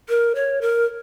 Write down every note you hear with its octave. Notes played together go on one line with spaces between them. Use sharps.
A#4
C#5
A#4